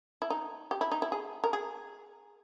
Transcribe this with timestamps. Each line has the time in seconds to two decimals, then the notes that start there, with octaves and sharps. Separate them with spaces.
0.22 E4
0.30 D#4
0.71 G4
0.81 E4
0.92 D#4
1.02 E4
1.12 G#4
1.44 A#4
1.53 G#4